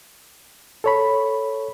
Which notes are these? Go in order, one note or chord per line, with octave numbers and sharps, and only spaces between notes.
A4 C#5 B5